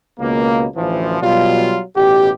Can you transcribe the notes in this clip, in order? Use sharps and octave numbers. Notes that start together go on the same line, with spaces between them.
C#2 B2 A#3
A1 D2 E3 F3
B2 F#3 G3 F4
A1 B2 G4